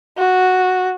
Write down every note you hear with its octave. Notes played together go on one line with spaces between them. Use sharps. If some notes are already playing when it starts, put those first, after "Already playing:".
F#4